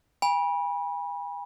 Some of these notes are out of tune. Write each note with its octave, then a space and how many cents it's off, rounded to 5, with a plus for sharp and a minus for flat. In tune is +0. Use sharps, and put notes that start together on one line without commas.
G#5 -45 B5 -25